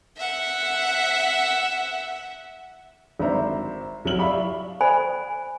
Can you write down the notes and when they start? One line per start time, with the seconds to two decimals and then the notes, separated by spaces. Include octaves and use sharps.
0.18 E5 F#5
3.20 G#1 D4 C5 E5 A#5
4.05 C2 F#3 E4 F6 F#7
4.19 D5 E5 F5 B5 C#6
4.81 C5 D5 G#5 B5